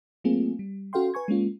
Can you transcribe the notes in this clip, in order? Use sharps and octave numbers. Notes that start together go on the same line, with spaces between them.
F#3 A3 A#3 C4 F4 G#4
G3
C#4 F#4 A4 F5 G5 C6
B4 G#5 C#6 G#6
G#3 A#3 C#4 F4